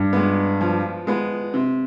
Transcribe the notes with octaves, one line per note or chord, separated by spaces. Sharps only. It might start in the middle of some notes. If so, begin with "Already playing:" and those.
Already playing: G2
G#3 B3
F3
G#3 B3
C3